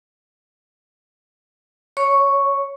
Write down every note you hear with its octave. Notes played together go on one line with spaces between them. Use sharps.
C#5 C#6